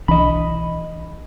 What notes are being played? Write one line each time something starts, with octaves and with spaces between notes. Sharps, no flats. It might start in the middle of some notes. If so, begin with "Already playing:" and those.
B1 E3 D4 D#5 B5